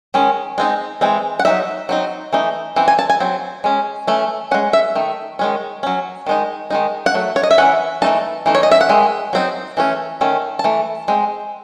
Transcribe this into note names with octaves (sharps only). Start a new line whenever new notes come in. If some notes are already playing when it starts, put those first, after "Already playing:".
D#3 G#3 C#4
G#3 C4 D#4
E3 G#3 C4
F#5
F#3 C4 D#4 E5
F#3 C4 D#4
E3 A3 D#4
E3 C4
G#5
A5
G#5
F#3 C4
G#3 C#4
E3 A3 C#4
G#3 C#4 F#5
E5
D#3 A3
D#3 G#3 C#4
F#3 C#4
D#3 G#3 D#4
D#3 G#3 D#4
F#5
F#3 A3
C#5
D#5
E5
E3 A3 C#4 F#5
E3 A3 D#4 A5
E3 A3 D#4
C#5
D#5
E5
F#5
D#3 G#3
F#3 C4 D#4
E3 A3 C#4
D#3 A3 C#4
A5
E3 A3
G#3 C4